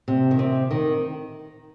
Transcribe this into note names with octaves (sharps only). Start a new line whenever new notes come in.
C3
D#3
C3
D#3